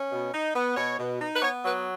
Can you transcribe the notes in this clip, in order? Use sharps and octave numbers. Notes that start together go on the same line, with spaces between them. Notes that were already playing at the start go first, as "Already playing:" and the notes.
Already playing: C#4
B2
D#4
B3
B2 C#5
B2
D#4
B4
B3 C#5
F#3 B4